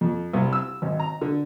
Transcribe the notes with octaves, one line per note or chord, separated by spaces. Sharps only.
F2
C2
E6
G#1
A#5
D3